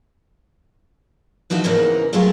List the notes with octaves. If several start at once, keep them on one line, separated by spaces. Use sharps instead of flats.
E3 F3 D#4 F#4 E5
E2 G#2 C#3 E3 B3 A#4
F#3 A3 C#4 F4 G#4 A#4